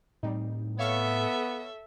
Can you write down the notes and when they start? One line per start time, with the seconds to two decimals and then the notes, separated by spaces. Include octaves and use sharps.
0.23 A2 G3 C4 D#4
0.78 B3 A4 C#5 E5 F5 C#6